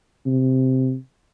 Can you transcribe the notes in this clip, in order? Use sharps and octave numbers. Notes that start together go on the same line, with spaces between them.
C3